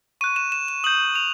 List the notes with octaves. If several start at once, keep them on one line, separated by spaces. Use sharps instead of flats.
C#6 F#6 D#7
E7
E7
E7
D#6 G6 F#7
F7